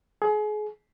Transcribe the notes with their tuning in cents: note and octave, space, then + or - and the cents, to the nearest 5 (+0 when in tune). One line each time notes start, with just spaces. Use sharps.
G#4 +30